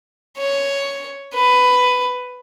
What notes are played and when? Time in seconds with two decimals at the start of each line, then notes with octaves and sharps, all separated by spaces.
0.38 C#5
1.35 B4